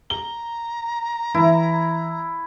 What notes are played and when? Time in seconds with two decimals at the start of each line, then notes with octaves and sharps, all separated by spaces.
0.10 A#5 G7
1.34 E3 E4